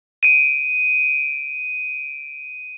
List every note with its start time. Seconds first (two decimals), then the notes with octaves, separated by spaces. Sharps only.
0.23 D7 D#7